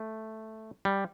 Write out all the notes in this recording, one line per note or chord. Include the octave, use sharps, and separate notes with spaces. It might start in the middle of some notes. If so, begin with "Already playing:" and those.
Already playing: A3
G3